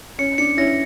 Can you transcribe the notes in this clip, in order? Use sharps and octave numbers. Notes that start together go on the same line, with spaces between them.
C#4 C#7
D4 C#7
C#4 E4 A#6